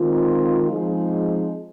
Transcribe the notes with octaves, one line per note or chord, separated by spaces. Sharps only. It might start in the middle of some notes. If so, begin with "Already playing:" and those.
Already playing: D#3 G#3 C4 F4
F3 G#3 C4 D#4 G#4